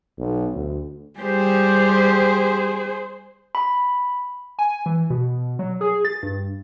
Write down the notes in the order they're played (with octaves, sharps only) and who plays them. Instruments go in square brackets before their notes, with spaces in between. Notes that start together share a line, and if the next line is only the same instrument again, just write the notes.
[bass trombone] B1
D2
[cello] G3 G4 [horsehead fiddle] G#4 C5
[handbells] B5
[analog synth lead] G#5
E3
B2
F#3
G#4
A6
G2